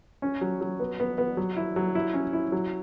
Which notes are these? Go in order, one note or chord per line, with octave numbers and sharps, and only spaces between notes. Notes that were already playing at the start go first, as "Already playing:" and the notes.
C#4
F#3
F#3
B3
B3
B3
F#3
E4
F#3
E4
C#4
E4
F#3